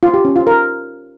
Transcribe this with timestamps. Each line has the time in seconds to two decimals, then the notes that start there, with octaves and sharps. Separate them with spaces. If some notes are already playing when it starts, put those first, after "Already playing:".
0.03 F4
0.14 G4
0.25 C#4
0.36 F4
0.47 A#4